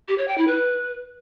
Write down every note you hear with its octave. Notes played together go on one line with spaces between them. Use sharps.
G4
C#5
G5
E4
B4